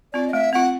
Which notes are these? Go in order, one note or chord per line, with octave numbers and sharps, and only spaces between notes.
C4 F4 D5
D#5
A3 E5
C4 F4 F#5